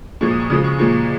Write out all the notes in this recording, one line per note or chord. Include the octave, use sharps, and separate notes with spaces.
A#2 F3 G#3 C#6
D#6
C#6
C#3 F3 G#3 D#6
C#6
A#2 F3 G#3 C#6